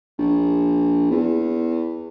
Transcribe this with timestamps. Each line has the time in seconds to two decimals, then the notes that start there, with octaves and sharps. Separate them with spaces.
0.19 A#1
1.11 E2